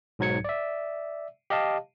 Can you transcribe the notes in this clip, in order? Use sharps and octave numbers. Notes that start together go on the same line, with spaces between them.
B1 G#2 F#3 G#6 C#7
D5 E5
G4 D#5 F5 A5